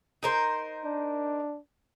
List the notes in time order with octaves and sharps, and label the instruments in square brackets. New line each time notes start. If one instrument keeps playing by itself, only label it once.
[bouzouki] D#4 A#4 C5
[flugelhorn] D4